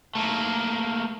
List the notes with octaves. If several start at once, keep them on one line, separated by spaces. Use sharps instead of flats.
A3 A#3